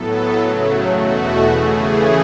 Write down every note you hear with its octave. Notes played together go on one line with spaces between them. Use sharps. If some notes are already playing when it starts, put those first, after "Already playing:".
Already playing: A2 F#3 B3 A4
C#3 F#3 A3
E2 B2 A3 F#4
C#3 E3 A3 G#4